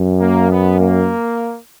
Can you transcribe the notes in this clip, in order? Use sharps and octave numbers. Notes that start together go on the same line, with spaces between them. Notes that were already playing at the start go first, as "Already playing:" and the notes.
Already playing: F#2
A#3
B3
A#3